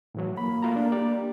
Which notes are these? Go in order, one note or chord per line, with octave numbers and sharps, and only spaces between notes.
A2 E3 F#3
A#3 B5
A3 F4 A#5
D4
G4 D5